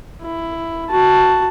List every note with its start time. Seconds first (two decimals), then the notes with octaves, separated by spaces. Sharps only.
0.22 E4
0.90 F#4 A5